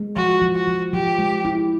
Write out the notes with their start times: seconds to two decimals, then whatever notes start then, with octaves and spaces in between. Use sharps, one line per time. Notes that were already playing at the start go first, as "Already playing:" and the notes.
Already playing: G#3
0.16 F3 F#4
0.41 F3
0.55 F#4
0.67 F3
0.93 F3 G4
1.19 G#3
1.45 E4